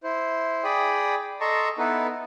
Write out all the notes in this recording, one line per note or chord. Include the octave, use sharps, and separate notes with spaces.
E4 C5
G#4 D5 G5 B5 D#6
A4 D#5 A5 A#5 C6 C#6
B3 D#4 E4 A4 B4